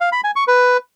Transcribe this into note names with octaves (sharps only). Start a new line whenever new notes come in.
F5
B5
G#5
C#6
B4